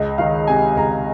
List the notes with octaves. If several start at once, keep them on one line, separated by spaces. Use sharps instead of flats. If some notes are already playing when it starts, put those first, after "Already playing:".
Already playing: C#2 D#5
D#3 F5
C3 G#5
C#2 A#5